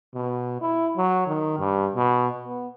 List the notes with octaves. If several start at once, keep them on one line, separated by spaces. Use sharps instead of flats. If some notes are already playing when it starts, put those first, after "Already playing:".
B2
E4
F#3
D#3
G2
B2
B3